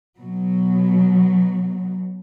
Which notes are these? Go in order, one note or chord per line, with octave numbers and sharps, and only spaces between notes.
B2 F#3